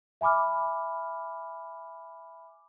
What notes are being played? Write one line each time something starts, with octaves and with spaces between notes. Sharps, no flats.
E5 G#5 B5 D6 F6